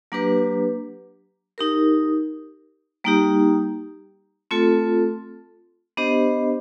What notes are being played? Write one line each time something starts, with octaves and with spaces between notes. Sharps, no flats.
F#3 A#3 D4 G4 B4
D#4 G4 A#4
G3 A#3 D#4 G4
A3 C4 F4 A4
B3 D4 G4 C5 D#5